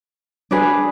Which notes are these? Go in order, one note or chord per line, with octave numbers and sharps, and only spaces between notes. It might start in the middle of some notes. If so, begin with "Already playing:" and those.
D4 G#4 B4